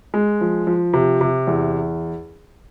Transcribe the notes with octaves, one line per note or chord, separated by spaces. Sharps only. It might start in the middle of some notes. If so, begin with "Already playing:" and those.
G#3
F3
F3
C3
C3
E2